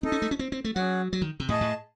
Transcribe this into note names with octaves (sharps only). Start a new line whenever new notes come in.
C4 D#4 A4 D#5
C#4
A3
C#4
C4
C4
A3
F#3 C#4 G#4 C#5 F#5
F#3
D#3
C3
A2 G#4 D#5 A5
A2